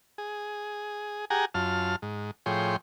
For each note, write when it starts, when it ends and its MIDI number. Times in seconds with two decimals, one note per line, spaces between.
0.18 1.25 68
1.30 1.45 67
1.30 1.45 68
1.30 1.45 78
1.30 1.45 80
1.30 1.45 82
1.54 1.96 42
1.54 1.96 65
1.54 1.96 81
1.54 1.96 89
2.02 2.31 44
2.46 2.76 45
2.46 2.76 53
2.46 2.76 68
2.46 2.76 73
2.46 2.76 79
2.46 2.76 84